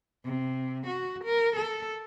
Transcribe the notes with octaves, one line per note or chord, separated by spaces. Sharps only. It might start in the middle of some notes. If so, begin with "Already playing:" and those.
C3
F#4
A#4
A4